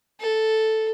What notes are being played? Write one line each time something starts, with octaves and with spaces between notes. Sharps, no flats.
A4